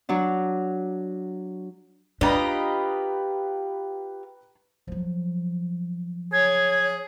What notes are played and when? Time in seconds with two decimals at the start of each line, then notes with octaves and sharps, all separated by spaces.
0.09 F#3 D4
2.21 D4 F4 G4 B4 D#5 A#5 B5
4.88 F3 F#3
6.33 G#4 C#5 G#6